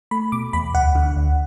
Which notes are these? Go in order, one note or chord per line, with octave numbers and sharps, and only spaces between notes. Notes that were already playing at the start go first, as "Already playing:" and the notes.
A3 B5
B2 D6
E2 B5
D2 F#5
D3
D2